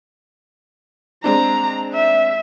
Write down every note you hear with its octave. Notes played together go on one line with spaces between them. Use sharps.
G#3 C4 D4 A#5
E5